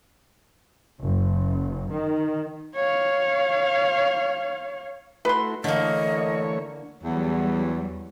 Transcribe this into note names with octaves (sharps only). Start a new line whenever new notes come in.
F#1
D#3
C#5 F5
A3 E4 F#4 B4 C6
D3 E3 A3 A#3 C#5 D#5
E2 F#3 G3